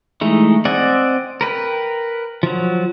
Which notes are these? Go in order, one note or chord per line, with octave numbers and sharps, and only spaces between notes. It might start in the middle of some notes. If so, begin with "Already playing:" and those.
E3 G#3 A3 D#4
C4 D5 D#5 F#5 G#5
A#4 B4 G5
F3 F#3